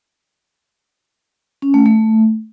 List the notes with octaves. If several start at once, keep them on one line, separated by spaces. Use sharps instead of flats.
C#4
A3
A3